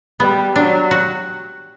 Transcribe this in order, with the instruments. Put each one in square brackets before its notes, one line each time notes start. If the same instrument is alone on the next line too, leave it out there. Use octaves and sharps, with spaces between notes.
[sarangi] G3 [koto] B3
[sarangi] F#3 [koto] D4
[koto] F#4